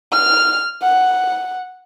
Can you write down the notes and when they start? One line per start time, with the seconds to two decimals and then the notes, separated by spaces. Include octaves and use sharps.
0.12 F6
0.82 F#5